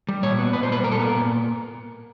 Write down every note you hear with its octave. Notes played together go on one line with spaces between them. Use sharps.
G3
A#2 C#5
B3
A#2 B4
C5
G3 B4
A#2 A#4
A4
B3 A#4
A#2